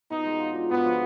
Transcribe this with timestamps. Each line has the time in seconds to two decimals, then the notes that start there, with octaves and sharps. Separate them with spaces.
0.11 B2 D#4
0.25 G#3
0.40 F4
0.55 D4
0.69 G#2 B3
0.84 F3